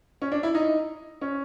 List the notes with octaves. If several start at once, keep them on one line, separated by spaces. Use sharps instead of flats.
C#4
D4
E4
D#4
C#4